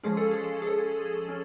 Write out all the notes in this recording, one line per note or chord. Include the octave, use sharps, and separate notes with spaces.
F3 G#3 C#4 G#4
A4
G#4
G#4
A4
C#4